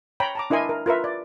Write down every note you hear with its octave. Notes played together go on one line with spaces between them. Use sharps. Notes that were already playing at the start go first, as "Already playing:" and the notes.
C#5 G5 A#5 B5
A5 A#5 D6
D4 E4 A#4 D#5 G#5 C6
A#4
F4 A#4 B4 E5
D5